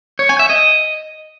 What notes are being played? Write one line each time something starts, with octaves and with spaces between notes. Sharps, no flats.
C#5
G#5
E5
D#5